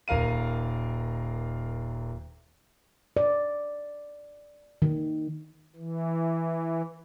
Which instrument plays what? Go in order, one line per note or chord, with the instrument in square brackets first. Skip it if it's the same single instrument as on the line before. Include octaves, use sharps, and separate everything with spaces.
[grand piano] D#1 A#4 F5 D#7
[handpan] D5
D#3
[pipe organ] E3